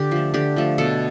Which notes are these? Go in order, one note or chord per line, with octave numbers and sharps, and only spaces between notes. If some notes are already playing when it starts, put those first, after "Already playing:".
Already playing: D3 G4
F3 A3
D3 G4
F3 A3
B2 A4